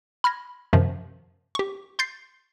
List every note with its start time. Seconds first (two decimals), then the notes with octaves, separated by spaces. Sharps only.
0.24 B5 F6 G#6 A#6
0.73 F#2 C3 D#3 F3
1.55 G4 C#6
1.99 C6 G6 A6 C7